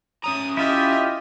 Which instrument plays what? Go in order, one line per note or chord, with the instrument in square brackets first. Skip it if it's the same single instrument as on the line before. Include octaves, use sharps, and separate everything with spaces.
[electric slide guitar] C#4 C#5 A#5 [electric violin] D#6
[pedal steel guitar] E4 F4 G4 [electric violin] D#5 E5